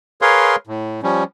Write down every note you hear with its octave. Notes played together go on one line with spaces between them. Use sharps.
G#4 A#4 B4 C#5 F5 C6
A2
F3 G3 C#4